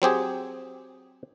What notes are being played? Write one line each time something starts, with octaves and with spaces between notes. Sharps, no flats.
F#3 C4 G4 G#4